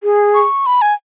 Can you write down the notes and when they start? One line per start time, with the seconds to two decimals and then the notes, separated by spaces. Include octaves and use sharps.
0.03 G#4
0.34 C#6
0.66 B5
0.82 G#5